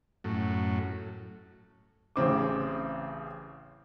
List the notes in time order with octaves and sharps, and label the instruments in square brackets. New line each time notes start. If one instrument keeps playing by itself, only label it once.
[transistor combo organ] F#2 A2
[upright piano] A1 C#3 C4 D6